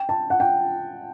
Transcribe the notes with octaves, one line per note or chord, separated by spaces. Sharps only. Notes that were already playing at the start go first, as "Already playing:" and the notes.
Already playing: G5
A5
F#5
G5